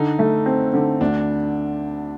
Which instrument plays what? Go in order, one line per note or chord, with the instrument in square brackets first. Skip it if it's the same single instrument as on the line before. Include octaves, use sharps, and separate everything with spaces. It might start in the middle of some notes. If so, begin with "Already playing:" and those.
Already playing: [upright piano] D3 [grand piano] D#4
[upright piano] A3
C4
D3
[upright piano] D2 [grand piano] D4